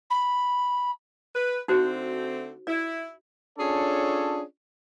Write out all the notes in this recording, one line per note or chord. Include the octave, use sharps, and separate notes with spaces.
B5
B4
D3 A3 C4 D#4 F#4 C5
E4 D5
C#4 D4 F4 G#4 A4 C#5